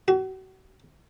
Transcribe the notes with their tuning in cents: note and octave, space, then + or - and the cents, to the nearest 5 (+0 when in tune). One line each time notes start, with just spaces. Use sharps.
F#4 +35